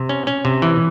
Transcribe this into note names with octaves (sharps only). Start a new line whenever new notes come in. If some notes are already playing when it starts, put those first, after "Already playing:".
Already playing: C3
C#4
C#4
C3
E3